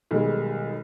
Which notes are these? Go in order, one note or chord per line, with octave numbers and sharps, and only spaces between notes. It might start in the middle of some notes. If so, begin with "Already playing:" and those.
B1 D#3 G3 G#3